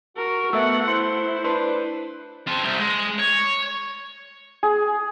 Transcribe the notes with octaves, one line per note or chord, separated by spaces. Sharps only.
F#4 A#4
A3 B3 E5 F#5 E6
E4 C5 C6 C#7
D4 B4 C5 C6
C4 A5
C2
G#3
C#5
G#4